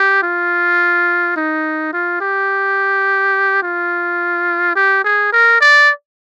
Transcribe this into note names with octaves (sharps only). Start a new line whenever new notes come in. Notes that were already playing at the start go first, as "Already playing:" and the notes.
Already playing: G4
F4
D#4
F4
G4
F4
G4
G#4
A#4
D5